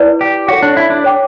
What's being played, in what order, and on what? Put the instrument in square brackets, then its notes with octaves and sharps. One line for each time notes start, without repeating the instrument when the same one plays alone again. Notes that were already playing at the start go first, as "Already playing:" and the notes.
Already playing: [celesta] E4 B4 D5
[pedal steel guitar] G4
[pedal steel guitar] F#4 [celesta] A4 C#5 F#5
[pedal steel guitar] D4
E4
D4
[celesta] C#5 G5 D6